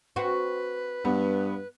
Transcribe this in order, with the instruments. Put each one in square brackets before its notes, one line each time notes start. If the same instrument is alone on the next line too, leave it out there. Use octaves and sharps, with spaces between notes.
[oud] C4 F#4 [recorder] B4
[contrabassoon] G2 [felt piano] B3